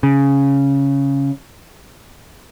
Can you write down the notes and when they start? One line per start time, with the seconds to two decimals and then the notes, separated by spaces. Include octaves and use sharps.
0.03 C#3